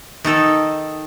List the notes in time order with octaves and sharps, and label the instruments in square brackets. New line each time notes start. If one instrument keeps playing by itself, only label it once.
[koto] D#3 D#4 A4